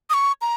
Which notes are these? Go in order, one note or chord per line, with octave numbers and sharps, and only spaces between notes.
D#6
C#6
A#5